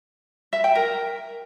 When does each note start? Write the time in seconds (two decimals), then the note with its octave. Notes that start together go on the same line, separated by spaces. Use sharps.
0.53 E5
0.64 G5
0.75 A#4